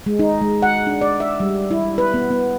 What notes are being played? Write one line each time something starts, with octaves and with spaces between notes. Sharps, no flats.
G#3
D#4
G#3
F#5
D4
D5
E5
G3
E4
B4
B3
B3